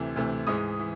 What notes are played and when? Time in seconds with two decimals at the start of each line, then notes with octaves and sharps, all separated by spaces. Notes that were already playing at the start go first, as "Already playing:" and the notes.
Already playing: D2 C3 E3 A3
0.16 D2 C3 E3 A3
0.47 G#2 E3 G#3 D#6
0.79 E3